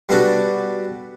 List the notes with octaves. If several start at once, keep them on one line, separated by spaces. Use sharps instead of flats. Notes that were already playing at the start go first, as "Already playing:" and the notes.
G3 B3 D4 F#4 A4